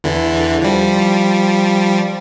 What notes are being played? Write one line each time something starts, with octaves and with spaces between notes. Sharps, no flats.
E2 D3 E3
F3 G3